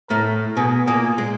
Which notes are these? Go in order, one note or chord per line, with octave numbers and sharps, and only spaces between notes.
A2 A3 A#4
B2 B3 G#4
A#2 A#3 G#4
G#3